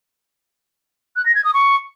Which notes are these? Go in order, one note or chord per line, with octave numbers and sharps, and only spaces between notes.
F#6
A#6
G#6
D#6
C#6